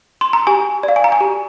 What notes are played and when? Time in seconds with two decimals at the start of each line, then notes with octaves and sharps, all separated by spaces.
0.21 C6
0.33 A#5
0.47 G4 G#5
0.83 D5
0.88 F5
0.96 G#5
1.04 A#5
1.12 G#5
1.21 G4